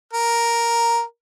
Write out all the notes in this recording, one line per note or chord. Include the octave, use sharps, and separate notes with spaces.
A#4